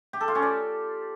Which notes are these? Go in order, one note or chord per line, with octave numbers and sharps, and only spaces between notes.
G4
A4
F4
C#4
D5